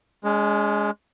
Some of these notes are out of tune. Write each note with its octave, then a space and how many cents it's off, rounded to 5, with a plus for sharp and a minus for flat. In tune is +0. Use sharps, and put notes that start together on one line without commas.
G#3 +0 C#4 +45